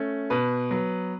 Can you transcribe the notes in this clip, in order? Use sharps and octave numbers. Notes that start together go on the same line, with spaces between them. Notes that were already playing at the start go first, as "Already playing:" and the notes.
Already playing: A3 C#4
B2 B4
F#3 B3